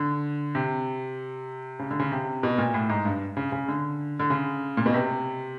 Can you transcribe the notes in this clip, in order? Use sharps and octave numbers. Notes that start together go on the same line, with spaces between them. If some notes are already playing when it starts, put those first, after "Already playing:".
Already playing: D3
C3
C#3
D3
C#3
C3
B2
A#2
A2
G#2
G2
C#3
C#3
D3
D3
C#3
A#2
B2
C3